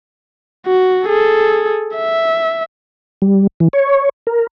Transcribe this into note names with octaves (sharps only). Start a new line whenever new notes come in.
F#4
G#4 A4
E5
G3
E3
C#5
A#4